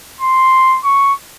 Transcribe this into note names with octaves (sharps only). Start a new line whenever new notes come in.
C6
C#6